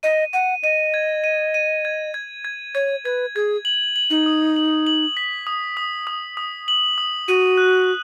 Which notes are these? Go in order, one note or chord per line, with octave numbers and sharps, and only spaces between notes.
D#5 D#7
F#5 D#7
D#5 D#7
G#6
D#7
D#7
G#6
G#6
G#6
C#5 G#6
B4 G#6
G#4 G#6
F#7
F#7
D#4
D#6
F#7
F#7
B6
D#6
D#6
D#6
D#6
F#7
D#6
F#4 D#7
F#6